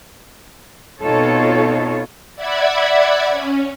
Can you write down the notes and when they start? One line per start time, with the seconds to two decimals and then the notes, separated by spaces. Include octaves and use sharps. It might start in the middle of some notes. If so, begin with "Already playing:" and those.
1.01 B2 C4 D#4 F4 A4 C#5
2.36 D5 E5 F#5 B5 G#6
3.30 C#4